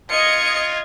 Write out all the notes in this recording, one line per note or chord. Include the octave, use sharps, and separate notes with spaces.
F4 D#5 G#6 C#7